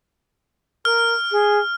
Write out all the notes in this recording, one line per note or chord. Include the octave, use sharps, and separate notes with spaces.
A#4 F6
G#4